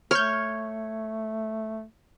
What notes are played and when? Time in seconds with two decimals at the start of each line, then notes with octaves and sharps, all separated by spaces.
0.11 A3 C#5 F6 G6